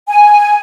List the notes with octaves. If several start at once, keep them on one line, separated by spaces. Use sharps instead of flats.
G#5